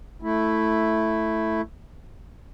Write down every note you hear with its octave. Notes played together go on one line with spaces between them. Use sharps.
A3 E4